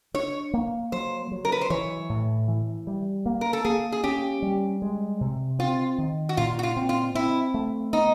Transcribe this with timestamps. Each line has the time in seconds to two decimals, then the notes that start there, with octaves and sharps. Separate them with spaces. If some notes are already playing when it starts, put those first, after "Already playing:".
0.14 D4 C#5
0.54 A#3
0.92 F#3 C5
1.32 F#3
1.45 A#4
1.52 B4
1.61 C5
1.70 E3 C#5
2.10 A2
2.48 E3
2.87 G3
3.26 A#3
3.41 A#4
3.53 A4
3.65 A#3 G#4
3.92 G#4
4.04 C#4 G4
4.42 G3
4.82 G#3
5.21 C3
5.59 C4 F4
5.98 D#3
6.29 F#4
6.37 A#2 F4
6.59 F#4
6.63 F4
6.77 C4
6.89 F4
7.15 C4 E4
7.54 A3
7.93 B3 D#4